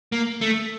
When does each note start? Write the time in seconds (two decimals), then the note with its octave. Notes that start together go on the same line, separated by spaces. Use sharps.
0.12 A#3
0.41 A3